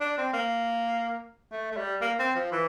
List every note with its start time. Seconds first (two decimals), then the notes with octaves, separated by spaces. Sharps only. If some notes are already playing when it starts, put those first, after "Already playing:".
0.01 D4
0.18 C4
0.33 A#3
1.52 A3
1.72 A3
1.77 G3
2.01 A#3
2.19 C4
2.35 F3
2.52 E3